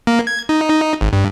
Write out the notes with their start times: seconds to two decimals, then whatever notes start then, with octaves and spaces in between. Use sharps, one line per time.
0.07 A#3
0.27 G#6
0.49 D#4
0.69 D#4
1.01 G#1
1.13 G2